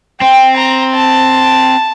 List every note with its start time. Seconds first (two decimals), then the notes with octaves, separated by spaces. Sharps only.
0.21 C4 G5
0.57 A#5
0.95 A5